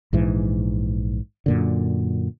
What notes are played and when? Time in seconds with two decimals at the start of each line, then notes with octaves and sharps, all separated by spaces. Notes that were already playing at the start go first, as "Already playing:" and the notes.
0.13 A#1 G#2 E3
1.46 F#2 A#2 D3